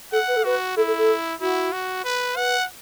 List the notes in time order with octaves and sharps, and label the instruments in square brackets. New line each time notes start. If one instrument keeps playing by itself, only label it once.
[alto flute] A4 [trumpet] F#5
[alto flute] B4
A4
[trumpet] F#4 [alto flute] B4
[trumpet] E4 [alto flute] A4
[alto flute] A4
A4
[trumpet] E4 [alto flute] F#4
[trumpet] F#4
B4
[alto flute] B4 [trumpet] F#5